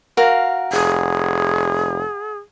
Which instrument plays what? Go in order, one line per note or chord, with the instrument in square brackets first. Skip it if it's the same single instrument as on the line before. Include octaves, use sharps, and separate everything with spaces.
[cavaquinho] F#4 A#4 F5
[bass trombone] F1 [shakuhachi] G#4